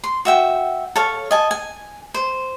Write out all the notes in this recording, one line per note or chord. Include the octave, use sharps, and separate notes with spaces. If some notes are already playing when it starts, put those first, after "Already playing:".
C6
F#4 E5 G5
A4 C#5 F5
D#5 G#5 A5
G#5
C5